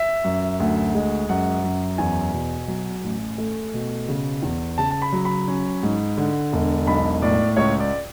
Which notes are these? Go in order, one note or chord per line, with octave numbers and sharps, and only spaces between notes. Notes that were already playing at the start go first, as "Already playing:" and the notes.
Already playing: E5
F#2
D2
G#3
F#2 F#5
F#2
E2 G#5
B2
F#3
A1
A3
B2
C#3
E2
C#3 A5
A5
B5
F#3
B5
C#4
G#2
D3
E1
B1 B5
A2 D5
C#2 C#5
D5